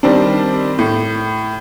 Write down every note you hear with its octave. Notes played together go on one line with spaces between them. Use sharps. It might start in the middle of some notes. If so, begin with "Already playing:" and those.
D#3 G3 C4 D4
A2